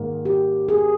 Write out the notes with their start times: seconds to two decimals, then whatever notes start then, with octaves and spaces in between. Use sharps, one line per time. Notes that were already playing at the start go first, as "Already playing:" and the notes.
Already playing: G#2 D#3 A#3
0.25 G4
0.69 G#4